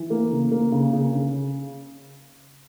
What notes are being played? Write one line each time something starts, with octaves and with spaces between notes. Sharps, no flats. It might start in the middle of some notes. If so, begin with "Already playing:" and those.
Already playing: E3
A#3
C#3
A#3
C#3
C#3
C#3